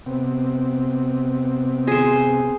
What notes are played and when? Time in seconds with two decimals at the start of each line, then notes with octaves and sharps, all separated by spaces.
0.06 C3 B3 C4
1.87 G#4 C5